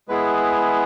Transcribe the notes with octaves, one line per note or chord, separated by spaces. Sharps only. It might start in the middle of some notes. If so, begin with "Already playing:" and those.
G#3 B3 E4 G#4 B4